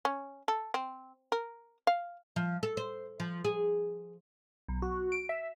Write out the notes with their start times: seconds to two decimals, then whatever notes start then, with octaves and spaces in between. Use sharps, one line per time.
0.05 C#4
0.48 A4
0.74 C4
1.32 A#4
1.87 F5
2.36 F3
2.63 A4
2.77 C5
3.20 F3
3.45 G#4
4.68 B1
4.82 F#4
5.12 D7
5.29 E5